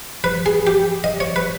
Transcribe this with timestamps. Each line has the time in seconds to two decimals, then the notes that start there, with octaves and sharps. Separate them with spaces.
0.24 B4
0.46 G#4
0.67 G4
1.04 D#5
1.20 C#5
1.36 B4